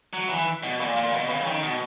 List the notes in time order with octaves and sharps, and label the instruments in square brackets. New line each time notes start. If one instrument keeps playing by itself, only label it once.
[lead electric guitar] F#3
E3
B2
A#2
A#2
B2
C#3
E3
D#3
B2